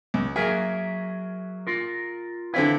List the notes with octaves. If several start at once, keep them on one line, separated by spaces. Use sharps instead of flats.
C#2
F#3 A#3 G#4 A#4 E5
F4 A#4
D3 C4 E4 F4 B4